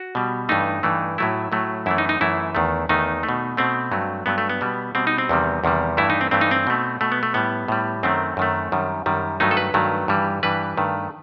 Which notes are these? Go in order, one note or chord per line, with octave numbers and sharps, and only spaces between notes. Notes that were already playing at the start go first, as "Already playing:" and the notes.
Already playing: F#4
B2 G3
G2 E3 A3 D#4
G2 E3 A3
A2 F#3 A3 E4
A2 F#3 A3
F#2 E3 A3 E4
D#4
D#4
F#2 E3 A3 E4
E2 D#3 A3
E2 D#3 A3 D#4
A3
B2
B2 A3 C4
G2 F#3 A3
G2 F#3 A3 B3
A3
B3
B2 G3
B2 G3 C4
D#4
C4
E2 C3 D#3 G3
E2 C3 D#3 G3
G2 E3 A3 E4
D#4
C4
G2 E3 A3 C4
D#4
C4
B2 A3
B2 A3
B3
A3
A2 G3 B3
A2 G3
F#2 D#3 A3 C4
F#2 D#3 A3
F#2 D#3 G3
F#2 D#3 G3
G2 D#3 F#3 A3 D#4
A4
B4
G2 D#3 F#3 A3
G2 E3 G3
G2 E3 G3 B4
G2 D#3 A3